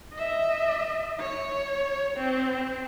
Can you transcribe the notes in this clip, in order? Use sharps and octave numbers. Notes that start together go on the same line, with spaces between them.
D#5 E5
C#5
C4